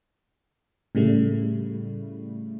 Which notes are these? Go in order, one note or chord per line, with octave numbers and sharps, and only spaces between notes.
A2 C#3 G3 A3